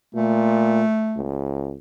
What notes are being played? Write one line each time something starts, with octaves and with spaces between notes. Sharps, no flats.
A#2 A3
C#2